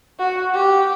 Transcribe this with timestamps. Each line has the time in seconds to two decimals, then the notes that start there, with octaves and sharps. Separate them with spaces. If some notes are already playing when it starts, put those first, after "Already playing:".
0.19 F#4
0.53 G4